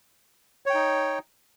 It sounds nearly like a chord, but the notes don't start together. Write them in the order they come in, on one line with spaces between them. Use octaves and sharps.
C#5 G5 D#4